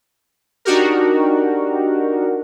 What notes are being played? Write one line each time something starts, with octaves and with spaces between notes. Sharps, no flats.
D4 D#4 F#4 G4 A#4